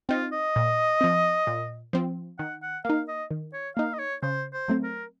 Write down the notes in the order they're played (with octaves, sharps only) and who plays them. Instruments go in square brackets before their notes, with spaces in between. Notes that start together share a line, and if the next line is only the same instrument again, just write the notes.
[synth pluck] C4 D#4 [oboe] F4
[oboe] D#5
[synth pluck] A#2
F3 C4
A#2
F3 C4
[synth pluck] D#3 [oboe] F#5
[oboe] F#5
[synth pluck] A#3 D#4 [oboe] F5
[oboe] D#5
[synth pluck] D#3
[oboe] C#5
[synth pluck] A#3 D#4 [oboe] F5
[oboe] D#5
C#5
[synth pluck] C#3 [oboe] C5
[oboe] C5
[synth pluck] F#3 A3 C4
[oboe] A#4